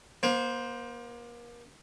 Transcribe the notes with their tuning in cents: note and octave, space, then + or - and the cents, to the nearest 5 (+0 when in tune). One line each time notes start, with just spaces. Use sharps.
A#3 +35 C5 +0